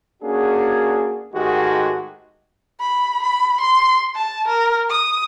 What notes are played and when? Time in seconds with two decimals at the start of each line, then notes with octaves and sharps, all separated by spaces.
0.22 A#3 C#4 D4 F#4 G#4
1.34 G#2 D#3 G#3 A3 F#4 G4
2.80 B5
3.23 B5
3.61 C6
4.15 A5
4.48 A#4
4.90 D#6